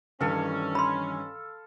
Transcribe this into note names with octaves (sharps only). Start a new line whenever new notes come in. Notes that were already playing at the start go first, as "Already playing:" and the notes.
G2 D#3 E3 C#4 A4 F5
B5 C6